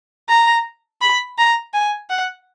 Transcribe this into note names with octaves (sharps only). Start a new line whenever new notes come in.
A#5
B5
A#5
G#5
F#5